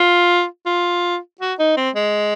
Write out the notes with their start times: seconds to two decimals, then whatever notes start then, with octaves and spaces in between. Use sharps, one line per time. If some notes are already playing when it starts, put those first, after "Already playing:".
Already playing: F4
0.66 F4
1.41 F#4
1.59 D#4
1.77 C4
1.95 G#3